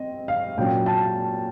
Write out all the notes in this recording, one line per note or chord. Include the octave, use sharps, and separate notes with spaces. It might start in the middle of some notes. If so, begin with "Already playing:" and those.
Already playing: C4 D#5
F5
A#2 F#3 A#3 C#4 G5
A5